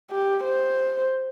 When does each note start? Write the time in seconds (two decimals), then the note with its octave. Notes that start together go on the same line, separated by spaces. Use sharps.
0.11 G4
0.44 C5